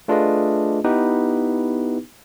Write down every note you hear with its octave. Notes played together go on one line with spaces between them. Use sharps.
A3 D4 F4 G#4 B4 D#5
B3 D#4 E4 G4 B4